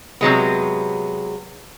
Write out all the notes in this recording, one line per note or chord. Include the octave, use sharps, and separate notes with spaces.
C3 F#3 G#3 B3